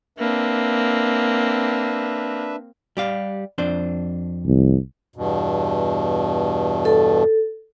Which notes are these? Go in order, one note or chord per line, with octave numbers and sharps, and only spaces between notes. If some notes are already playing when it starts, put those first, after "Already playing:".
A#3 C4 D4 B4 E5
G3 G4 F5
F2 D4 C5
C2
E2 G2 B2
A4